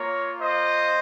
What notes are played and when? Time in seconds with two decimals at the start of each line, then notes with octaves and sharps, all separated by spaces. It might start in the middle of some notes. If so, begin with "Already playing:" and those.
Already playing: A#3 F4 A#4 C#5
0.40 C5 D#5